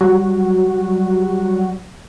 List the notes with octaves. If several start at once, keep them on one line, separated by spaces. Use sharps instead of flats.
F#3 G3 F#4